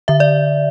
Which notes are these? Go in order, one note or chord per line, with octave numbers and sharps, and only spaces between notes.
D3 E5
D5